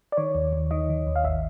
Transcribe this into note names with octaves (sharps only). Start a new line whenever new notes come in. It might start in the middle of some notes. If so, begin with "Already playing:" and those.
D5
D#3 C#5
D#2
D#2
D#3 D#5
D#3
D#2
F5
G#1 E5